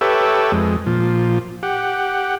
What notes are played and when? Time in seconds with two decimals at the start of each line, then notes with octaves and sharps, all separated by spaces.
0.01 G4 A4 B4 C#5 E5
0.52 F2 G#3
0.86 A#2 F3
1.63 G4 F#5